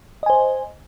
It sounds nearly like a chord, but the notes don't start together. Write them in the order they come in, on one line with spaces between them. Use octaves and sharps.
D#5 G#5 C5